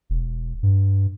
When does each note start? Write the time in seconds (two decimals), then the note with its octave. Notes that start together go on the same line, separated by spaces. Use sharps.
0.10 E1
0.63 G2